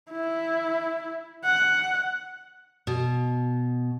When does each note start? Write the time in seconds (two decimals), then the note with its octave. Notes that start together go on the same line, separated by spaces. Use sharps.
0.12 E4
1.44 F#5
2.87 B2